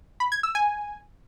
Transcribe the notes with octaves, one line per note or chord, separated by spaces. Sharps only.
B5
G#6
E6
G#5